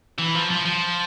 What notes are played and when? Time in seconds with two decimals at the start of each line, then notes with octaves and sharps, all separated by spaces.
0.19 E3
0.35 F3
0.51 F3
0.65 F3